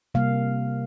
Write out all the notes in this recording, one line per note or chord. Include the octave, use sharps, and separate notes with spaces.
C3 G3 A#3 F5